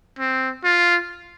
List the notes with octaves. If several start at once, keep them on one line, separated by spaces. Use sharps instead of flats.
C4
F4